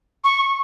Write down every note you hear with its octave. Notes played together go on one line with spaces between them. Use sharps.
C#6